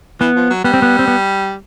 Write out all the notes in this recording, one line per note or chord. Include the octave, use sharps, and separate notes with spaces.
E3 B3
F3
F#3
G3 B3
C4
B3
C4
B3